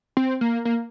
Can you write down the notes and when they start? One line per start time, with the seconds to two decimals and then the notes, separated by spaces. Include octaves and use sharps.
0.17 C4
0.41 A#3
0.65 A#3